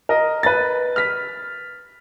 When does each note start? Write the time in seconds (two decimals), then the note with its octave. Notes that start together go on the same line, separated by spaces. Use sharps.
0.09 A#4 D#5
0.43 B4 A6
0.96 F6 B6